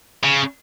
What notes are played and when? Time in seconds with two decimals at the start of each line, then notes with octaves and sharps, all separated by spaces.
0.24 C#3